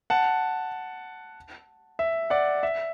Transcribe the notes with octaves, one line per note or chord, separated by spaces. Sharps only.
F#5 A5
E5
D5 F#5
E5